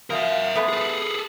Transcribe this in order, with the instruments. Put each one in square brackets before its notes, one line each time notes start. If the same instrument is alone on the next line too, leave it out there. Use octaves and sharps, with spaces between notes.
[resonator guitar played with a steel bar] F3 F#4 F5 [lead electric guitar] A#4 E5
[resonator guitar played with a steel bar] G#3 A3 B3
[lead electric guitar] G#4 A4